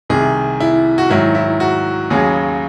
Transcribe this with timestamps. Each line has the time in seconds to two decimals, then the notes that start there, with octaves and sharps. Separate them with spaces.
0.09 C2 C3 D#3 G#4
0.60 E4
0.98 F#4
1.10 G#2 D#3 F#3 E4
1.35 E4
1.60 F#4
2.10 D#2 C#3 F#3 G#4